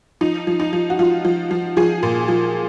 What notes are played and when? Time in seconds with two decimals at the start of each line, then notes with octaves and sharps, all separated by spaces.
0.21 F3 D#4
0.47 F3
0.60 D#4
0.73 F3
0.90 F#4
0.99 F3 F4
1.25 F3
1.51 F3
1.77 F3 G#4
2.03 A#2
2.28 F3